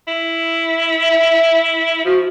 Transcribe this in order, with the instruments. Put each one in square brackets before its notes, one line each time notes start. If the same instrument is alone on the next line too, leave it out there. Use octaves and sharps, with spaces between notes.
[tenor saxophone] E4
[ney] E5
[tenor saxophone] F3 [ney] F#4